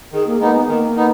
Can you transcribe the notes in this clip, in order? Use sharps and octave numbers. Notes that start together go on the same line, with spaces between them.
D#3 G#4
A#3
G#3 A#3 B3 D#4
B3
D#3 A#3
B3 D#4